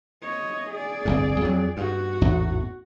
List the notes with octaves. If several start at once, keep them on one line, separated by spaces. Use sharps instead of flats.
C#5 D#5
G#4 D5
G1 C2 A2
F2 F#3
G2 F#4
A1 E2 G#2